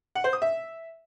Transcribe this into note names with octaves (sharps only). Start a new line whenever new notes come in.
F#5
C5
D#6
E5